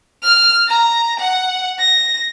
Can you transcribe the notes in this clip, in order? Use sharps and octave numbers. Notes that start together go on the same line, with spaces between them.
F6
A#5
F#5
A#6